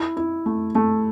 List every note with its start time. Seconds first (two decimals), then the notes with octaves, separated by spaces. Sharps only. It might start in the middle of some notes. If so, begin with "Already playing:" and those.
Already playing: E4
0.17 E4
0.46 A3
0.75 A3